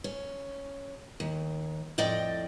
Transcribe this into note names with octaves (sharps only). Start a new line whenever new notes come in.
C#4
D#2
F2 A2 D5 D#5 G5